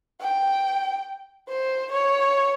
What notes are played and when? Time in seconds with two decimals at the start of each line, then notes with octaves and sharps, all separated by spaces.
0.20 G5
1.49 C5
1.92 C#5